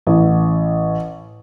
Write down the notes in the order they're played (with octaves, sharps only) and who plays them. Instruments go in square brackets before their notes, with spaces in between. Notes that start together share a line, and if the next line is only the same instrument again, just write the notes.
[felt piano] A1